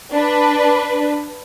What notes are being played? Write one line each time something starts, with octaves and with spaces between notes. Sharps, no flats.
D4 B4